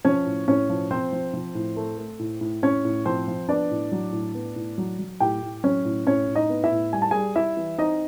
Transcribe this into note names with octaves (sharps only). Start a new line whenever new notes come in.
F3 C#4 C#5
A2
A2 C#4 C#5
F3
F3 C4 C5
F3
F3
A2
A3
A3
A2
A2
A2 C#4 C#5
A2
F3 C4 C5
F3
B3 D4 D5
A2
F#3
A2
B3
A2
F#3
F#3
A2 G4 G5
A2
F#3 C#4 C#5
A2
A2 C#4 C#5
A2
D#4 D#5
B3
E4 E5
A2
G3 G#5
A5
G3 G#4 G#5
G3 E4 E5
E3
C4 D#4 D#5